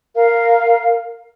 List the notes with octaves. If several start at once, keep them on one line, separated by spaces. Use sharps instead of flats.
A#4 F5